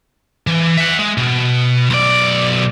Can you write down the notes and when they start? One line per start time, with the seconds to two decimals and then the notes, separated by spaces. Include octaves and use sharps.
0.47 E3
0.77 E5 F#5
0.99 G#3
1.18 B2
1.90 B1 D5